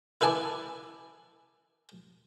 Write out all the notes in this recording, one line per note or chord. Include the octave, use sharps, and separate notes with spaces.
E4 B4 E5 G#5 A5 D6